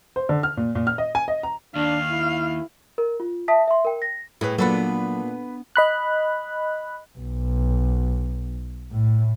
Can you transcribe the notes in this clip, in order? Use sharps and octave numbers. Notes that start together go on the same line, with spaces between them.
C5
D3
F6
A#2
A#2
F6
D#5
G#5
D#5
A#5
D#2 D4 F5
E4
A#4
F4
E5 A5 D#6 B6
E5 C6
A#4 G5
A#6
A2 E4 G#4 B4
A#2 F#3 B3 D4 A4 B4 B5
D#5 B5 F#6
B1
A2